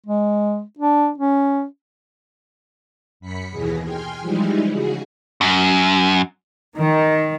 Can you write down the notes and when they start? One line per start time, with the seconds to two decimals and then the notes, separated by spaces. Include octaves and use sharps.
0.06 G#3
0.79 D4
1.18 C#4
3.20 F#2 B5 B6 C#7
3.52 D#2 B2 E3 G#4 A#6
3.83 G5 G#5 C6 F6
4.20 E3 F3 G3 G#3 D#4 E4
4.70 C#3 F#4 G#4
5.41 F#2
6.79 D#3